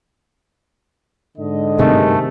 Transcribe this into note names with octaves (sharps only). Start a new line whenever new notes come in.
G#2 D3 D#5
G2 C3 D#3 G#3 A3